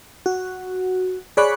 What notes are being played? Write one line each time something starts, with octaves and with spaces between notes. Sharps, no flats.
F#4
G#4 C#5 D5 B5 C#6 F#6